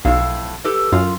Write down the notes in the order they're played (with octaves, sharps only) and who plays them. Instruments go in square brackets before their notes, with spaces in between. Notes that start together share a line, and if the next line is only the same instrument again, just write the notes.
[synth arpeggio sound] B1 [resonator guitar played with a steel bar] F2 A2 F5
[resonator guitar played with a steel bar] G4 A4 B4
[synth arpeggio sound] F#2 [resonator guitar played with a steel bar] F4